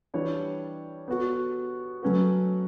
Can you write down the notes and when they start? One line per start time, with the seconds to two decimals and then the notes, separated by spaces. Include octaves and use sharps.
0.14 E3 G3 D4 G4 C#5
1.08 B3 F#4 A4
2.02 F#3 A3 C#4 F#4 B4